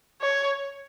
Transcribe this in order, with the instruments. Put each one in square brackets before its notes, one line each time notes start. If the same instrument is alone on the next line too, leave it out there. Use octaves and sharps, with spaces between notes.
[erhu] C#5